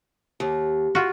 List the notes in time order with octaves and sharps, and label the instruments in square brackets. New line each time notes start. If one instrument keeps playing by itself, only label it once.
[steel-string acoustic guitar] D#2
[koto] F4 F#4